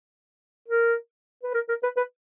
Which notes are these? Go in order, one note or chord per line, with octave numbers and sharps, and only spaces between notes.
A#4
B4
A#4
A#4
B4
B4